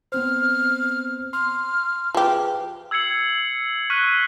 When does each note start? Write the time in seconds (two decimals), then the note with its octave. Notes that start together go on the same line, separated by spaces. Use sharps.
0.12 B3 C4 C5 F6
1.33 C6 F6
2.15 F3 F4 G4 G#4 B4
2.91 E6 G#6 C7 C#7 F#7
3.90 C#6 F6 F#6 B6 C7 D#7